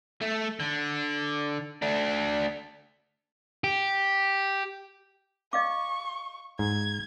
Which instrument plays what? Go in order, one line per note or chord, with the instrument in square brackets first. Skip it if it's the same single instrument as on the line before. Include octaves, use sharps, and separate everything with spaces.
[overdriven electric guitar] A3
D3
A3 D4
G4
[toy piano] D#5 F5 D6 [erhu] C#6
[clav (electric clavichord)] G#2 [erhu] G#6